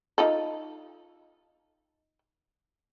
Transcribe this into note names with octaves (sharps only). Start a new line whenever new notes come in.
D#4 F4 A4